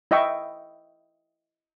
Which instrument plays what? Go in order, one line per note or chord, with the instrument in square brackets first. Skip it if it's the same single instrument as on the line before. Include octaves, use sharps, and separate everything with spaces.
[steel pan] E4 D#5 E5 G5 C#6